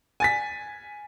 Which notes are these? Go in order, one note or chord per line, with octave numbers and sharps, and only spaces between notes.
G#5 A6 B6